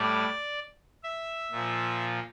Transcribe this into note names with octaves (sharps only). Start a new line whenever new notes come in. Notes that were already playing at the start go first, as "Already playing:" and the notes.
Already playing: A2 G3 D5
E5
A#2 F3